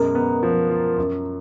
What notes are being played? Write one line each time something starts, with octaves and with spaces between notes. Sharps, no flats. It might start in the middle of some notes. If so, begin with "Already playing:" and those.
Already playing: F#2 B2 G#3 A#4
B3
F3
F4
F#2